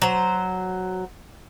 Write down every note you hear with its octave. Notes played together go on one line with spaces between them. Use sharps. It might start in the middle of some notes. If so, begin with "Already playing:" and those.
F#3 C5